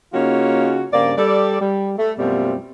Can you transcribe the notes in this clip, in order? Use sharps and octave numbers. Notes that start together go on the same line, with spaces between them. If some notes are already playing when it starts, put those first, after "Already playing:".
C#3 A#3 C#4 D#4 F4 F#4
G2 C#3 A#3 C4 D5
G3 A4 D5
G3
A3
F#2 B2 G3 A3 C4 F4